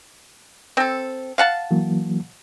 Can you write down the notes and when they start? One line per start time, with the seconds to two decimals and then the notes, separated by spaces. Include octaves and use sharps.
0.77 C4 A4
1.38 F5 F#5 A5
1.71 E3 F#3 A#3